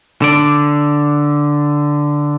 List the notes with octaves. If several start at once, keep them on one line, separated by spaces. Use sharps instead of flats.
D3 D5